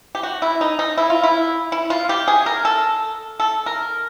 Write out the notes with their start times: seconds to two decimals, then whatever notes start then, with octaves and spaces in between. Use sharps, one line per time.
0.15 G4
0.23 F#4
0.42 E4
0.61 D#4
0.79 D#4
0.98 E4
1.10 F4
1.23 E4
1.72 E4
1.90 F4
2.09 G4
2.28 G#4
2.46 A#4
2.65 A4
3.40 A4
3.66 A#4